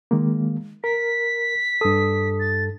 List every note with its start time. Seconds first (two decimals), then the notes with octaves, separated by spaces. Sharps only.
0.11 D#3 G#3 A#3
0.84 A#4 B6
1.81 G2 A4 D#6
2.40 A6